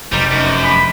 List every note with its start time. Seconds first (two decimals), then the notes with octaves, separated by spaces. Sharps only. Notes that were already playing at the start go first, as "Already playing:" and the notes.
0.12 F1 G3 D#4 C5 D6
0.31 F#2
0.64 B5